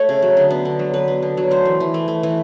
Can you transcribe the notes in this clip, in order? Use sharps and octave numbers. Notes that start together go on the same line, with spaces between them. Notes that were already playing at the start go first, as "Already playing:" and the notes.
Already playing: A3 C#5
C#3
F#3
D3
B3
D3
F#3
D3 B4
B3
D3
F#3
A3 C5
E3
E3
A3
A3
E3